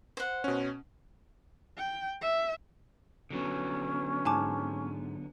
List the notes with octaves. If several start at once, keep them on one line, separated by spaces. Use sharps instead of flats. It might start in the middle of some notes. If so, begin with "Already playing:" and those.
C5 F#5
B2 C#4
G5
E5
D3 F#3 B3 C#4
G#2 G#5 A5 D6